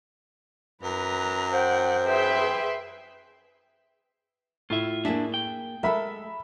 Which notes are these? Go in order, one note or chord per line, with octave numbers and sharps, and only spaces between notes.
F#2 B4 A#5
C5 F#5 G5
G#4 B4 E5 G5 C6
A2 F4 E5
A#3 D4 G#4 E5
G5
G#3 A4 A#4 E5 B5